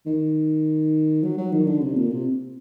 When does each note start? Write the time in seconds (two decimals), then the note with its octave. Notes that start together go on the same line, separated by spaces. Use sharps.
0.06 D#3
1.23 F#3
1.37 F#3
1.52 D#3
1.67 D3
1.81 C3
1.96 A#2
2.11 C3